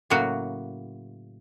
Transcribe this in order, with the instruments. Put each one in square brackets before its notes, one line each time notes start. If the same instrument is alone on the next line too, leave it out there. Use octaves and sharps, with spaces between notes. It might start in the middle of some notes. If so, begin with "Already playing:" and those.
[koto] A2 C#3 F#3 A#3 F#4